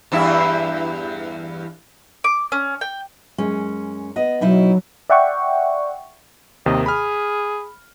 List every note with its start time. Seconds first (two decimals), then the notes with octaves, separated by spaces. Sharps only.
0.12 E2 G2 E4
2.24 D6
2.52 C#4
2.81 G5
3.38 F#2 G#3 C#4
4.16 B3 D#5
4.41 B2 F#3 D#4 E4
5.10 D5 E5 F#5 G5 C#6
6.66 D#2 C3 D#3 D#5
6.86 G#4 B5 F6